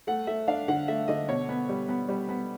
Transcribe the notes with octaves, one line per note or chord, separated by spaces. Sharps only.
A3 F#5
A3 E5
D4 F5
D3 F#5
A3 E5
D3 D#5
B2 C#5
B3
G3
B3
G3
B3